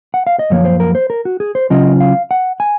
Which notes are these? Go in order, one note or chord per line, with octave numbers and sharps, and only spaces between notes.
F#5
F5
D#5
F#2 F3 A#3 C#5
C5
A#4
C5
A#4
F#4
G#4
C5
C#3 F#3 C#4 F4 D#5
F5
F#5
G#5